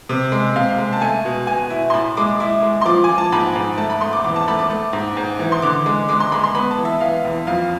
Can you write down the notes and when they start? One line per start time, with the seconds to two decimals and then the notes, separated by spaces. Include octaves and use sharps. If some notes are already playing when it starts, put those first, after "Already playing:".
0.09 C3
0.32 G#3
0.56 C3 F5
0.79 G#3
0.93 A5
1.01 A3 G#5
1.25 B2
1.47 B2 G#5
1.70 E4
1.90 C6
1.94 A2 B5
2.17 G#3 D6
2.40 E4 D6
2.63 G#3
2.81 C6
2.85 F3 D6
3.04 F3 G#5
3.18 A5
3.32 G#2 B5
3.56 G#2
3.78 A3 A5
3.90 B5
4.01 A3 C6
4.13 D6
4.24 E2 D6
4.36 A5
4.48 A3 B5
4.59 D6
4.70 A3
4.93 G#2
5.17 G#2
5.39 E3
5.52 C6
5.62 D3 D6
5.86 G#3
6.09 G#3 D6
6.20 C6
6.32 G#3 B5
6.44 C6
6.55 B3 B5
6.71 A5
6.78 E3
6.85 E5
7.01 E3 F5
7.25 E2
7.47 F2 F5